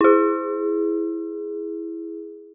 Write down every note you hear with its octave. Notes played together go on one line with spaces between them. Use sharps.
E4 G#4